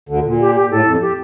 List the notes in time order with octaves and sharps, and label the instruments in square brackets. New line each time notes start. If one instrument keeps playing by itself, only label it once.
[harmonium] D2 D3
A#2
[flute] G4
G4
[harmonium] A2 [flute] A4
[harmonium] F2
[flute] G4